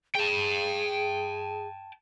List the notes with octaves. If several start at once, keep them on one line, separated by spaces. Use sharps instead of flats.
G#4 G5 A5